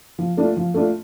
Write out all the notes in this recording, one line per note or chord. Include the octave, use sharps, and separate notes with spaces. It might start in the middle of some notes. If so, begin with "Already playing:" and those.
F3
A3 D4 F4
F3
A3 D4 F4